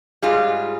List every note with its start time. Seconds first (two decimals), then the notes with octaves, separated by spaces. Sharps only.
0.22 G#2 G3 F4 G#4